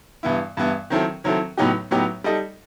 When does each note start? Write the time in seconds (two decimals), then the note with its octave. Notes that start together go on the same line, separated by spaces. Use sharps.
0.23 G2 E3 B3 E4
0.57 G2 E3 B3 E4
0.90 D#3 F#3 C4 E4 A4
1.24 D#3 F#3 C4 E4 A4
1.57 A2 F#3 B3 D#4 G4
1.91 A2 F#3 B3 D#4 G4
2.24 G3 D#4 A4 D#5